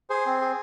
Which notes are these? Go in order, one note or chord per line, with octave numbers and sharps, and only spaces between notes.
G#4 C5
C4
G#4